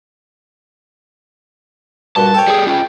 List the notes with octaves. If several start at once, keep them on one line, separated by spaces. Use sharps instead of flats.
G2 A#2 F#4 A5
A4 C#5 G5
G3 G#4
C#4 F4 G5